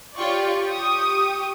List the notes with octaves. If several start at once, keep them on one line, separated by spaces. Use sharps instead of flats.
F4 G4 C#5 D5 G5 C#6
D#6